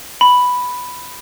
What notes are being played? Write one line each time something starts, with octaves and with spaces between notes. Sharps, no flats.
B5